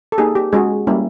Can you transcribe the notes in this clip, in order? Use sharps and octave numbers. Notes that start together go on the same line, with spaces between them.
A4
A#3 D#4 G4 G#4
G4
G#3 C#4 F#4 G#4
G3 A#3 C#4 E4